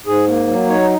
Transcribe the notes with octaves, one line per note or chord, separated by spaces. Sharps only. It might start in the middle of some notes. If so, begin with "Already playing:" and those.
G#2 G#4
A#3
F#3
D#4 C#5